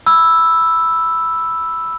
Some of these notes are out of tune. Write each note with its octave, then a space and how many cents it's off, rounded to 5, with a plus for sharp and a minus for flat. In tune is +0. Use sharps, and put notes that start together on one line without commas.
B5 +0 E6 +0